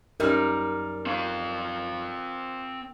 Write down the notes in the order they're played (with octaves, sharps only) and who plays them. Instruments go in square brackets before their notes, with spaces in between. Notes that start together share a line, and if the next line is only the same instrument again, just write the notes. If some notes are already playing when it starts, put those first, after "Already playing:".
[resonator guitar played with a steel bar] F#2 G3 D#4 [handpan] A#4
[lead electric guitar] C4 F5